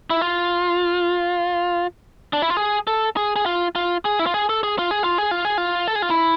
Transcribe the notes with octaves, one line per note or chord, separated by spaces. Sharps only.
E4
F4
D4
E4
F4
G#4
A4
G#4
G#4
F4
F4
G#4
E4
F4
G#4
A4
G#4
F4
G#4
F4
G#4
F4
G#4
F4
A4
G#4
F4
E4